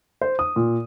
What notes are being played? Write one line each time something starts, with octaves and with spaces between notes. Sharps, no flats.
C5
D#6
A#2